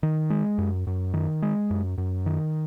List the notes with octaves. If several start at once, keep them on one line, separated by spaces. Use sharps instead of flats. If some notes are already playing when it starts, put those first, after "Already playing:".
D#3
G#3
F#2
F#2
D#3
G#3
F#2
F#2
D#3